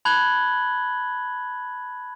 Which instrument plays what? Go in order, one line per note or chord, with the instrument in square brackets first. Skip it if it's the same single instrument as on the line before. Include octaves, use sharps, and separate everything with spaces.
[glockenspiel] A5 B5 F#6 G#6 F#7 G7